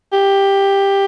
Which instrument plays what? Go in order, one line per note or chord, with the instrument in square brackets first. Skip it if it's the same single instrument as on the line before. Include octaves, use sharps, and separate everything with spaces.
[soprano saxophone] G4